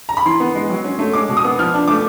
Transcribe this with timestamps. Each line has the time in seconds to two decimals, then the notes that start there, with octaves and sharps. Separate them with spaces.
0.09 A#5
0.17 B5
0.25 E3 C6
0.40 B3
0.55 G#3
0.70 F#3
0.84 C#4
0.99 A3
1.13 G#3 D6
1.29 B2
1.37 D#6
1.44 B3
1.59 F3 F6
1.74 D4
1.88 A3 D6